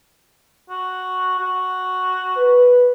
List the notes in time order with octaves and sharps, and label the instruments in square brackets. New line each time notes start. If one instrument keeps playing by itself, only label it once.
[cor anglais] F#4
F#4
[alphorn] B4